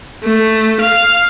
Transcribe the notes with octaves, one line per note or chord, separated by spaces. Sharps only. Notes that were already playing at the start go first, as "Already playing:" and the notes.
A3
F5